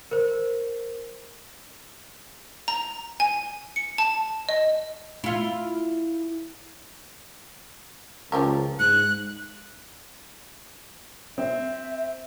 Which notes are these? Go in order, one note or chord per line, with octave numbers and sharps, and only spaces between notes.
A#4 C5
A#5
G#5
C#7
A5
D#5
E4 F4
C#2 F3 G4 A#4
G#2 F#6
C4 E5